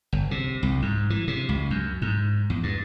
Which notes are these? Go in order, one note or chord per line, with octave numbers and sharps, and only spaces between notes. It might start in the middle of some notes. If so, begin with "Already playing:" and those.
G1
C3
C2
G#2
E3
C3
C#2
F#2
G#2
E2
G2